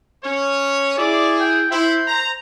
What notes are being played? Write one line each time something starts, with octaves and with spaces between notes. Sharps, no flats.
C#4 C#5
E4 G#4 D5
G5
E4 C5
A#5